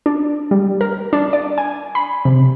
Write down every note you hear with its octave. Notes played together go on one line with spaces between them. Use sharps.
D4
G3
A#4
D4
D5
G#5
B5
C3